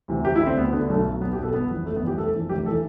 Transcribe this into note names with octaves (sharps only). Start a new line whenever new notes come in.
D2 C3 E3
D2 G4
E4
D3
C4
D2 B3
D3 B3
B1 A3
B2
B1 B3
G4
B2
A4
G1 B3
F2 E3
G1 A3
B3
F2 E3 G4
F1 A4
F2 E3
F1 G4
A4
E3